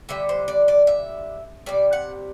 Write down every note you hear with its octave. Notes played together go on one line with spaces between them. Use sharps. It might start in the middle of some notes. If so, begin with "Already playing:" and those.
D3 G3 E5
C5
D5
D5
E5
C3 G3 D5
F#5